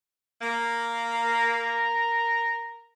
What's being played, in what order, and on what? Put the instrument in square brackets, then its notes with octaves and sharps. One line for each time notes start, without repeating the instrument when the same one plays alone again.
[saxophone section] A#3
[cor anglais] A#4